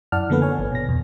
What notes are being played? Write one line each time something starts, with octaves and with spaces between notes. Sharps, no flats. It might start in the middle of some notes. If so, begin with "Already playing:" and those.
F#2 E4 D5 F#5 A5 F6
D3 F3 A#3 B3 A4 B4
C#5 G#5
G1
B2 A#6
E2 B2